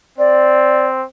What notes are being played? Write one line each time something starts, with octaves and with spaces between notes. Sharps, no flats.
C4 D5